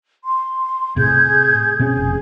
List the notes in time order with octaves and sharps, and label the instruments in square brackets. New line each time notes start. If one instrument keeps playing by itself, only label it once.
[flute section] C6
[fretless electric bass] A2 C3 [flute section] G#4 G6 G#6
[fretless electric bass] B2 C4 C#4 [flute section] G#4
[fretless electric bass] F1